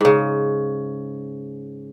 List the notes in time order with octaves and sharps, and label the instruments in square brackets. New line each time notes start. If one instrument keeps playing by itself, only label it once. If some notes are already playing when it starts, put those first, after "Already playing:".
[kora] G#2 C#3